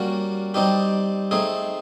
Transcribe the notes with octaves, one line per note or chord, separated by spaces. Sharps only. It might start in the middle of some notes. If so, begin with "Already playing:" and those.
Already playing: G3 A#3 C#4 F#4
G3 C4 D#4 G4
A3 C4 D#4 G#4